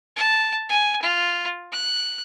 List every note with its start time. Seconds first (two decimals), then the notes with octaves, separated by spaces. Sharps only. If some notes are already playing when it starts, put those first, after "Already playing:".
0.17 A5
0.69 G#5
1.02 F4
1.72 F#6